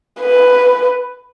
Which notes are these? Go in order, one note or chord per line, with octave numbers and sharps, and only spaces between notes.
B4